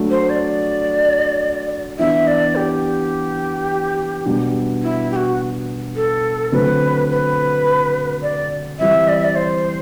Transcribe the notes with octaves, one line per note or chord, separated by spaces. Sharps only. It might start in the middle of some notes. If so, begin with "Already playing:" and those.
Already playing: F#3 A3 D4
C5
D5
E3 B3 D4 E5
D5
G4
B2 G3 B3 D4
E4
G4
F#4
A4
D3 F#3 A3 C4 B4
B4
D5
E3 G3 C4 E5
D5
E5
D5
C5